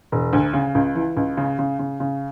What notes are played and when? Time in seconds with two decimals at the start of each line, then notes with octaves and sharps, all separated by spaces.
0.12 E1
0.33 D2
0.53 C#3
0.75 C#2
0.95 E3
1.17 C#2
1.37 C#3
1.59 C#3
1.79 C#3
2.00 C#3